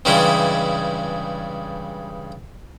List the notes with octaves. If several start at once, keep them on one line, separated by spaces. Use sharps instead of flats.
G2 C#3 E3 G3 G#3 E4